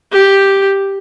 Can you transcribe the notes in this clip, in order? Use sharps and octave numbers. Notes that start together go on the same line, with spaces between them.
G4